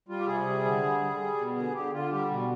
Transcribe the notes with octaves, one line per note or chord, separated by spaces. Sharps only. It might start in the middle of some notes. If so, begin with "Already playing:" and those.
G3 F4
G4
C3 G#4
G3
D3
G3
G3
G3
B2
D3 G#4
D3 G4
D3 F4
G3 G4
B2